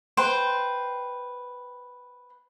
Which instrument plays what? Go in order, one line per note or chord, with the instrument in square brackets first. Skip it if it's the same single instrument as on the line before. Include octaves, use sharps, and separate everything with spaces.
[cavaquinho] B4 C5 G5